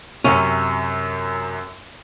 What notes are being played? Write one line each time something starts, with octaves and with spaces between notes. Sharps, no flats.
F#2 C3 C#4